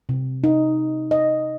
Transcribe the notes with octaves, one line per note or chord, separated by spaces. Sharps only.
C3
D#4
D#5